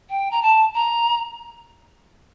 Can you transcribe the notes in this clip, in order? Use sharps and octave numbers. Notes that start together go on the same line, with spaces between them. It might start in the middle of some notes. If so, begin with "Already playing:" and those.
G5
A#5
A5
A#5